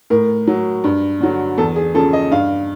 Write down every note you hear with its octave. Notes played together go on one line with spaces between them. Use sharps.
A2 A#4
F#3
G2
D3 F#3
E2 A4
G#4
C#3 F3 A4
D#5
G2 F5